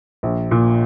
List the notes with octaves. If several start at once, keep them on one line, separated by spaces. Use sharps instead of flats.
A#1
A#2